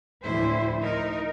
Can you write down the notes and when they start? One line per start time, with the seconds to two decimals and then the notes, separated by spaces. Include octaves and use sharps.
0.23 D2 A2 F3 E4 C5
0.83 D#4 A#4